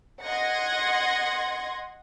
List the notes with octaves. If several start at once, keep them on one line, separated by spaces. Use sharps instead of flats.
D#5 F#5 C6 G#6 A#6